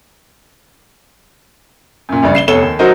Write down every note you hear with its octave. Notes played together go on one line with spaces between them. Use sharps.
F#2 A#2
A#1 G2 C#3 D5
C7 E7 G7
F1 B3 A4 C#5 E7 G7
D#2
F#3 D#4 F#4 A#4 C5 D#5